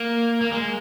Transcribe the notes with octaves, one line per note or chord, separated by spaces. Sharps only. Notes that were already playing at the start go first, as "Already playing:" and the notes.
Already playing: A#3
A#3
G#3